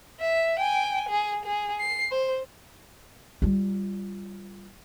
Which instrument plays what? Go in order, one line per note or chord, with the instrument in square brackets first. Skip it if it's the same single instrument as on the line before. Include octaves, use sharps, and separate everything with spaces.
[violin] E5
G5 G#5
G#4
G#4
C7
C5
[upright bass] G3 F4